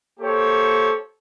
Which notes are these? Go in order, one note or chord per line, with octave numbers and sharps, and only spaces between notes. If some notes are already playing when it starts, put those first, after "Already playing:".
A#3 G4 A4 C5 C#5